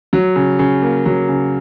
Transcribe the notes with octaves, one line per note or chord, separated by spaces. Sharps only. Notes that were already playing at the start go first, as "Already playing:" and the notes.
F#3
C#3
C#3
A#3
F#3
C#3